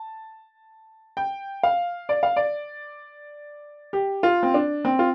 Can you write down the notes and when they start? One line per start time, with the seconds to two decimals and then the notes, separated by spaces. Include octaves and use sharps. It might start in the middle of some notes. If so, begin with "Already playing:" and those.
Already playing: A5
1.17 G5
1.63 F5
2.09 D5
2.23 F5
2.36 D5
3.93 G4
4.23 F4
4.43 C4
4.54 D4
4.85 C4
4.99 F4